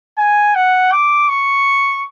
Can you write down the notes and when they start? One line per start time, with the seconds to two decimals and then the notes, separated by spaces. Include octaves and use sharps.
0.18 G#5
0.55 F#5
0.92 D6
1.29 C#6